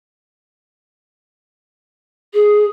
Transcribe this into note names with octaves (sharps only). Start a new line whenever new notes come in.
G#4